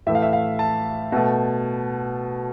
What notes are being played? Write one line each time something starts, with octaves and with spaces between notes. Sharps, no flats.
A2 E3 A3 E5
F5
E5
F5
A5
B2 A3